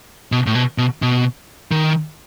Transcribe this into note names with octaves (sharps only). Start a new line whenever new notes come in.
B2
A2
B2
B2
B2
D#3